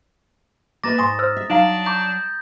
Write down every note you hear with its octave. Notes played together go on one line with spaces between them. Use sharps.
A#3 B4 E5 A#5 D6 A6 A#6
G#2 G#5 C6 C#6 D#6
C5 E6 F6
E5
F#3 D4 D#4 F5 A#5
A#5 C#6 D6 G6